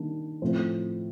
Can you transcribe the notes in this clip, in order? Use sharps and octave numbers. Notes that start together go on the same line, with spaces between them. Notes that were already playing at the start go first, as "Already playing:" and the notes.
Already playing: D#3 G3 A#3 D4
A2 F3 C4